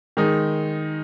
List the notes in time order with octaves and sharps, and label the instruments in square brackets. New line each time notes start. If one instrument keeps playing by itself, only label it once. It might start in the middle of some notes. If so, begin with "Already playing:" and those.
[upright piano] D#3 G#3 D#4